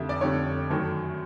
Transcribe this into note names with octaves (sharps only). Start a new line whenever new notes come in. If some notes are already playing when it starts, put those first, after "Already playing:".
Already playing: F2 D3 G3 E5
D5
F2 D3 G3 C#5
F#2 D#3 F#3 A3